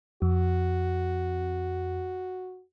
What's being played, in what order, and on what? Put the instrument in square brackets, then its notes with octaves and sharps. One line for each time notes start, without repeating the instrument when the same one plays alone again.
[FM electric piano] F2 [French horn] F#4